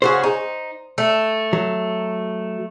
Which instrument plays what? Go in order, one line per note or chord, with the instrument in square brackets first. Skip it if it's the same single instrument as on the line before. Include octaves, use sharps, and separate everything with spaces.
[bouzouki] C#3 F#4 G#4 [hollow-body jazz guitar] C5
[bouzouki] D#4
A3
[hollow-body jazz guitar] F#3